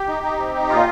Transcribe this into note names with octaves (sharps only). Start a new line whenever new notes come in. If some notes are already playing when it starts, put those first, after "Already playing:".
Already playing: G4
D#4
D#4
C4
D#4
A#2 F4